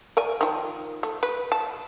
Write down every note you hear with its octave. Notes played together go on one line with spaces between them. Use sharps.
A#4 D5 G#5
D#3 F3
A3
B4
A5